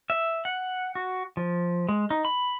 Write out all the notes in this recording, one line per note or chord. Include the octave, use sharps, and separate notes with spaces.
E5
F#5
F#4
F3
G#3
D#4
B5